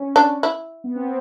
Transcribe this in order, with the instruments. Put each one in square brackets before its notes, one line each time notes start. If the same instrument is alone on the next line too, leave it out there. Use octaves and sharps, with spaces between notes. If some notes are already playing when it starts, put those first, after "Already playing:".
Already playing: [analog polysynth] C#4
[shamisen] D4
E4
[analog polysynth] B3
C4